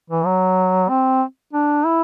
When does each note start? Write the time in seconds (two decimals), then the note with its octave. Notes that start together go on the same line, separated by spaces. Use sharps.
0.10 E3
0.25 F#3
0.89 C4
1.53 D4
1.86 E4